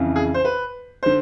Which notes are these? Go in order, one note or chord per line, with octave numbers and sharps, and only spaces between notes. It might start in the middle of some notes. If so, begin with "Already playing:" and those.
Already playing: F2 C#3 E3
G#4
C5
B4
D3 C5